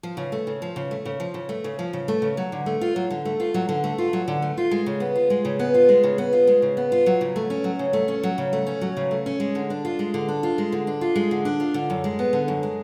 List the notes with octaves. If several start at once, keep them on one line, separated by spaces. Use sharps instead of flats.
F3
C#3
A3
C#3
F3
C#3
A3
C#3
F3
C#3
A3
C#3
F3
C#3
A3
C#3
F#3
D3
A3
F4
F#3
D3
A3
F4
F#3
D3
A3
F4
F#3
D3
A3
F4
G#3
C#3
B3
F4
G#3
C#3
B3
F4
G#3
C#3
B3
F4
G#3
C#3
B3
F4
F#3
C#3
A3
C#4
F#3
C#3
A3
C#4
F#3
C#3
A3
C#4
F#3
C#3
A3
C#4
G#3
D3
D4
F4
G#3
D3
D4
F4
G#3
D3
D4
F4
G#3
D3
D4
F4
D3
F#2
G#3
B3
D3
F#2
G#3